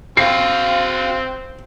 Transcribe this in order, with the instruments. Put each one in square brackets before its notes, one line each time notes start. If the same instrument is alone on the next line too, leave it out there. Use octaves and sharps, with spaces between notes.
[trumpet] C4 [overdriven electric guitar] F#4 F5 [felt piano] C7